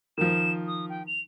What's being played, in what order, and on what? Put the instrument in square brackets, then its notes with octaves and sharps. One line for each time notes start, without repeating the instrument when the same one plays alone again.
[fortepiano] D#3 F3 [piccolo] E7
[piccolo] D#6
G5
F7